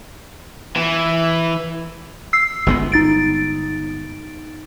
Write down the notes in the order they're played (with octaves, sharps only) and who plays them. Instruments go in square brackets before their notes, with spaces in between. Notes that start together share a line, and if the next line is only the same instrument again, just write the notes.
[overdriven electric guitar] E3
[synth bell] E6 C7
[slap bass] G1 G#3 B3
[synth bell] D#4 A6 D7